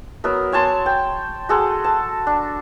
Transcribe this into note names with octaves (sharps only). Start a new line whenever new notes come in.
F#3 B3 A#4
C#5 G#5 A5 C6
G5
F#4 G#4 A4 C6
A5
D4